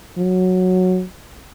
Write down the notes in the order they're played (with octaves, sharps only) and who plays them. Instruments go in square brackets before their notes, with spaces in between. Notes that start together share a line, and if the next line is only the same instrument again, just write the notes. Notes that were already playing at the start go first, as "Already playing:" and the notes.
[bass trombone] F#3